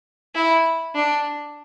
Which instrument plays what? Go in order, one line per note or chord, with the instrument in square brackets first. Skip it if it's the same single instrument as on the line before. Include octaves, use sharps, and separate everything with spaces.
[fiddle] E4
D4